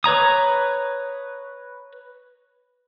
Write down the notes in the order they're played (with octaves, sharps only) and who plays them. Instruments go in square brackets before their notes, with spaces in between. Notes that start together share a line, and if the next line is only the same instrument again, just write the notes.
[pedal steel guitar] B4 C#5 A#5 D#6